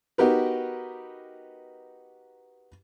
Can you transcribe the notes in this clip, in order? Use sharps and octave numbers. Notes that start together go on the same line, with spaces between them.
B3 D#4 F#4 G4 A#4 B4